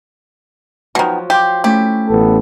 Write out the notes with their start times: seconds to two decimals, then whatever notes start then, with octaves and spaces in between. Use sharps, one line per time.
0.95 B2 D#3 F3 F#3
1.30 G4 F5 C6 D6
1.64 A3 C#4 E4 G4
2.08 A1 B3 A4